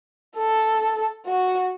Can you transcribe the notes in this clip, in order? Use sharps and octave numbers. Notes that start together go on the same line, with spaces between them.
A4
F#4